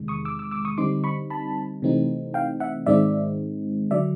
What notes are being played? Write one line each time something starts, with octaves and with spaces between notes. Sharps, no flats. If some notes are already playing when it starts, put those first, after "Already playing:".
Already playing: E2 C3 D#3 G#3
C#6 D#6
D6 E6
D6 E6
D6 E6
C#6 D#6
D3 G3 C4 D#4 C6 D6
B5 C#6
A5 B5
C3 E3 A3 C4 D#4
F5 G5
E5 F#5
G#2 D#3 G#3 C4 D#4 D5 E5
D3 F#3 D5 E5